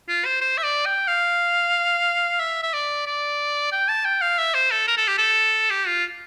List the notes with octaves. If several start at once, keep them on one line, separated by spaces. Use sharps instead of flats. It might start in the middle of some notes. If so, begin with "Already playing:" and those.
F4
C5
C5
E5
D5
G5
F5
E5
E5
D5
D5
G5
A5
G5
F5
E5
C5
A4
A#4
A4
G4
A4
G4
F4